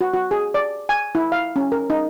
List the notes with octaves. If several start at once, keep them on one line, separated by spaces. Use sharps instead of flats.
F#4
F#4
G#4
D5
G#5
E4
F5
C#4
A#4
D#4